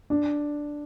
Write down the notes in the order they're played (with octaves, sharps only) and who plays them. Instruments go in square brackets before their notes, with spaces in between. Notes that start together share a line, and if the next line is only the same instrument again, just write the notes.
[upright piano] D4